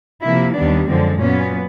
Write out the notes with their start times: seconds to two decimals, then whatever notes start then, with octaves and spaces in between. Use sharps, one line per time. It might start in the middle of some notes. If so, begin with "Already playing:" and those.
0.23 C3 F3 A#3 E4
0.55 D#2 D#3 G3 B3 D4
0.89 F#2 D3 F3 G#3 C4
1.21 A#2 F#3 B3 C#4